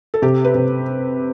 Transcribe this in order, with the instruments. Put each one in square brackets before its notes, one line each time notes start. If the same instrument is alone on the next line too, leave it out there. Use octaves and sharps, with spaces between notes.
[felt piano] A4
C3 G4
B4
C3